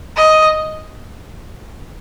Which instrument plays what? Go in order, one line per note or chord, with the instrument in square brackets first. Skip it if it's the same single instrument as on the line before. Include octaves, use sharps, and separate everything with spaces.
[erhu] D#5